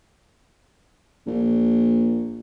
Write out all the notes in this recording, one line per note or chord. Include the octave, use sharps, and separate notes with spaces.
A#1